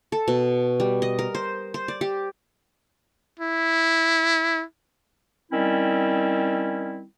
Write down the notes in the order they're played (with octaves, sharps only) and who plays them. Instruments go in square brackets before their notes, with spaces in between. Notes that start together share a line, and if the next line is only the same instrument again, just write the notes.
[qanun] A4
B2
G3
D#5
A#4
C5
C5
D5
G4
[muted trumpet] E4
[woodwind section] D#3 G3 C4 C#4 E4